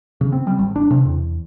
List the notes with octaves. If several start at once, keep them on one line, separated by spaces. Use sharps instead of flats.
C#3
C4
G3
G#1
D4
C3
E2